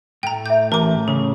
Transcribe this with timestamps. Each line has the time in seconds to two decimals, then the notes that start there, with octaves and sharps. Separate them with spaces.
0.23 A2 A3 G5 A#5
0.46 E5 D6 G6
0.72 A1 A#4 A5 A#5 D6
1.08 C#3 G#4